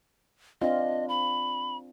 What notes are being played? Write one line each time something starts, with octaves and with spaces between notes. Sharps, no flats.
C4 D4 F4 D#5
B5